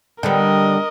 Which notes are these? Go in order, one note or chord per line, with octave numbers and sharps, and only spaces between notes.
D3 G3 B3 A#4 D#5